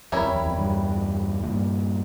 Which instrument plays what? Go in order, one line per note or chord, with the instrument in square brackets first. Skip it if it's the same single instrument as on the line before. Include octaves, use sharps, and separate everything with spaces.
[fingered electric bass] F2 [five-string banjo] G3 C#4 E4 A#4 C#5
[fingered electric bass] F2
E2
F2
E2 G2
A2
G2 A#2